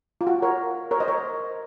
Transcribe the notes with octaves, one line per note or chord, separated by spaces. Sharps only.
F4
F#4
A#4 C#5
A#4 C#5
C5 D#5
A#4 C#5